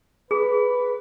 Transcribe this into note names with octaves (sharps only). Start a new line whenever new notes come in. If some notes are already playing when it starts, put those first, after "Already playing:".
G#4 B4